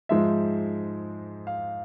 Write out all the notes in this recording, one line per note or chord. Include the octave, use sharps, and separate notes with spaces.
G#2 F3 G#3 E5
F5